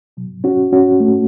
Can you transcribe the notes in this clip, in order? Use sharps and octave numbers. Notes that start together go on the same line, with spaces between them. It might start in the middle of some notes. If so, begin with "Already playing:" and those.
B2 F#3
C#4 F#4
C#4 F#4
A3